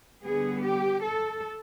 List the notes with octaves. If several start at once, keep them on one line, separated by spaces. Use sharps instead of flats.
D3 G3 B3 G#4
G4
A4